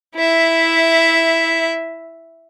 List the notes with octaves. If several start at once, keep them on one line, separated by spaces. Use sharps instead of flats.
E4 E5